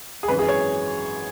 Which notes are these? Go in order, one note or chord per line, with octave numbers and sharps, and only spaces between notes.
G#4
G#1 F#2 E3 B4
G#4
C#5